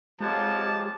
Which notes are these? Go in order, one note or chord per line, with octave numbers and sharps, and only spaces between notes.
F2 F3 F#3 G#3 G4 A5